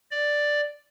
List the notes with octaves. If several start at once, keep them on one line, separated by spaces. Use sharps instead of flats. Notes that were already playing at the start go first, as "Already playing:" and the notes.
D5